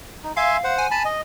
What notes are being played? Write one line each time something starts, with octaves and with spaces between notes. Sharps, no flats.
D#4
E5 F5 G#5 C6
C5 F#5
G#5
A5 B5
D#5